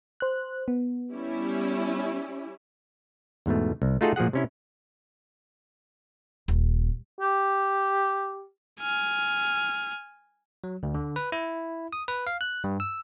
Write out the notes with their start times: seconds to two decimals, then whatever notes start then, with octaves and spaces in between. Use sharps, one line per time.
0.20 C5 F#6
0.68 B3
1.13 G3 C#4 E4
3.46 E2 G#2 B2 A3
3.82 C2
4.01 A3 D#4 F4 F#4 G#4 A4
4.16 A#2 F3 F#4 G#4 F#5
4.33 C3 C#4 E4
6.48 D#1
7.21 G4
8.81 G#5 F6
10.64 F#3
10.83 D2
10.95 D3
11.16 B4
11.32 E4
11.93 D#6
12.08 B4
12.27 F5
12.41 F#6
12.64 G2
12.80 E6